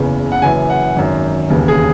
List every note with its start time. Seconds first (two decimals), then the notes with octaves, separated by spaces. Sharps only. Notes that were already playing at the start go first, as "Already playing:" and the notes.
Already playing: F#1 E2 C#3 E3
0.32 F#5
0.42 F#1 F#2 E3 G#5
0.70 F#5
0.96 G#1 F#2 D#3
1.50 E1 D#2 C#3 E3
1.68 G#4